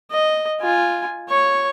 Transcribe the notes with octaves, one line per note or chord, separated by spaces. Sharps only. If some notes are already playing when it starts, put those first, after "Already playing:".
D#5
F4 G#5
C#5 C#6